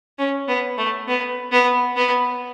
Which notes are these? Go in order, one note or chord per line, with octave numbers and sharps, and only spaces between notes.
C#4
B3
A3
B3
B3
B3